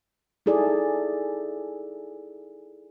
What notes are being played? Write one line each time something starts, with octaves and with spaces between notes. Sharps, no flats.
D#4 E4 G#4 A4 D5